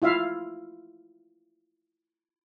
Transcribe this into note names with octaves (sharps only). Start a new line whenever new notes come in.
E4 F4 E5 F5